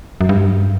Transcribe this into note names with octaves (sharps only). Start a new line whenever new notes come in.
F#2
G2